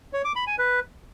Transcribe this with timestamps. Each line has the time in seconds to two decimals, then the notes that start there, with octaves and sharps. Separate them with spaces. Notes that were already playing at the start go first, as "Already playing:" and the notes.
0.13 C#5
0.24 D6
0.36 B5
0.47 G#5
0.58 B4